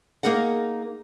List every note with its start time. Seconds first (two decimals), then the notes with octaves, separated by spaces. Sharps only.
0.23 A#3 D#4 G#4 A#4 F#5